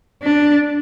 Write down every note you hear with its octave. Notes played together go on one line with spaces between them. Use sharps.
D4